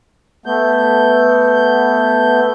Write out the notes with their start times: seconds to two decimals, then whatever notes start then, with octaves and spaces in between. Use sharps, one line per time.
0.46 A3 B3 G6